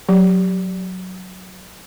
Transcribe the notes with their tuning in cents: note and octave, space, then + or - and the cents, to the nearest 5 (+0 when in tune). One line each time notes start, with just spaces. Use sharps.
F#3 +0 G4 +0